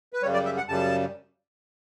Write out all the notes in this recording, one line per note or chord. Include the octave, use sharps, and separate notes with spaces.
B4
F#2 C#3 G3 C#5
D5
E5
F#5
F#2 C#3 G3 A5